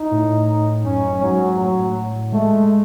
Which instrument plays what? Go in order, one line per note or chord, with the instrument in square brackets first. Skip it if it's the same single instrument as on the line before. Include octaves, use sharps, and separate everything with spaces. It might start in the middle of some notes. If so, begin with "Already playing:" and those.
Already playing: [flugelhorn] D#4
[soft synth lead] A2
[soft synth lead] F#2 [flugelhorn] C#4
[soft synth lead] F#2
[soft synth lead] G#2 [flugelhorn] F#3
[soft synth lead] A2 [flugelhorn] F#3
[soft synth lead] G#3 [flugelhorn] A3